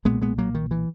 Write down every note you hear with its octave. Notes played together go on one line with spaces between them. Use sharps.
B1 A#2 G#3 B3
G#3 B3
F#3 A#3
D#3
E3